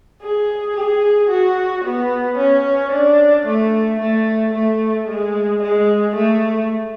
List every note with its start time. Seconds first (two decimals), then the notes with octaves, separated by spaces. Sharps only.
0.22 G#4
0.76 G#4
1.30 F#4
1.85 B3
2.38 C#4
2.92 D4
3.47 A3
4.00 A3
4.54 A3
5.08 G#3
5.62 G#3
6.16 A3